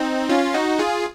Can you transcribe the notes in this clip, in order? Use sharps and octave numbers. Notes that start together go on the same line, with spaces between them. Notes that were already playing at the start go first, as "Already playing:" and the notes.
Already playing: C4 D#4
C#4 F4
D#4 F#4
F4 G#4